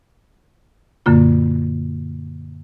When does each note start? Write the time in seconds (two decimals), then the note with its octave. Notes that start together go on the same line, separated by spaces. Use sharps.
1.06 F#2 A#2 D3 A#3 F4